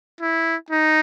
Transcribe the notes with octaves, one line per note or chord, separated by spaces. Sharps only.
E4
D#4